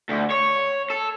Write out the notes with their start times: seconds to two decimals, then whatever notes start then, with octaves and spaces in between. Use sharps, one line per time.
0.09 D2
0.30 C#5
0.90 A4